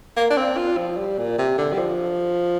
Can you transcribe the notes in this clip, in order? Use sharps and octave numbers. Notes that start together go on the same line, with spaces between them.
A#3
D4
C4
F4
F3
G3
A#2
C3
D3
G3
F3